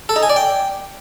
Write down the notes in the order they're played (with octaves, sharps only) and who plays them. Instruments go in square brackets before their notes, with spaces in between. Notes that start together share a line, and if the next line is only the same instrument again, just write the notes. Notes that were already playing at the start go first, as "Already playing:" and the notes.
[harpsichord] A4
D#4
G#5
D5
G5